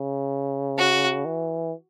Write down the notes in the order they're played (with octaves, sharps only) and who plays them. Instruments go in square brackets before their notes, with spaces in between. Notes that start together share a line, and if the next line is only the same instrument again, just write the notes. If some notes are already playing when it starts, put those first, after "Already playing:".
Already playing: [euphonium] C#3
[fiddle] F#4
[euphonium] E3